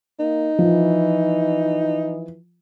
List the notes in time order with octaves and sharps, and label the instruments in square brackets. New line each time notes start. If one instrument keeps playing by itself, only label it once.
[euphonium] A#3 [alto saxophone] D#4
[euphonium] E3 [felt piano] F3